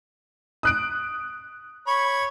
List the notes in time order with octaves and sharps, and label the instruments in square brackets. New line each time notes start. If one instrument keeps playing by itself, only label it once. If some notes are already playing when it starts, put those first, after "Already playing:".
[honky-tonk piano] D#6 F#6 D7
[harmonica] C#5 B5 C#6